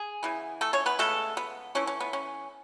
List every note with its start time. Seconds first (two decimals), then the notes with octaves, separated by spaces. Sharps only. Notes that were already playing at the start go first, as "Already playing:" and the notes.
Already playing: G#4
0.23 C#3 E3 B3
0.61 A3 A4
0.73 C#4 C#5
0.86 B3 B4
0.99 C#3 G#3 A3 B3 A4
1.37 B3
1.75 E3 A3 C#4
1.87 C#4
2.00 B3
2.13 C#4